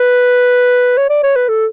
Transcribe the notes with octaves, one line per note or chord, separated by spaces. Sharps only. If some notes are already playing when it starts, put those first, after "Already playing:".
Already playing: B4
C#5
D5
C#5
B4
A4